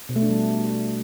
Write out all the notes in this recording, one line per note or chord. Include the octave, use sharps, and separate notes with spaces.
B2
A3
D4
G3